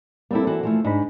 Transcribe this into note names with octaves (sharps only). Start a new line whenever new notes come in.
G3 A#3 C4 E4 A4
E3 F#4 C5
E3 F3 A3
G#2 D4 D#4 B5